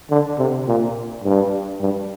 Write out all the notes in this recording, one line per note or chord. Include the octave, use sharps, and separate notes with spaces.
D3
C3
A#2
G2
G2